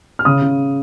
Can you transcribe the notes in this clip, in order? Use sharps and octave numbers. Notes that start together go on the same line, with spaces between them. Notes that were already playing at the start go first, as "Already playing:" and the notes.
F6
C#3 D#6
C#3